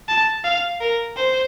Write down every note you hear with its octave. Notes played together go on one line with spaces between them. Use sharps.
A5
F5
A#4
C5